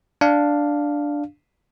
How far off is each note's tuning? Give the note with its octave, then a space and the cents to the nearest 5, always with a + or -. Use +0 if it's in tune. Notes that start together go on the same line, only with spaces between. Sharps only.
D4 +0 F5 +0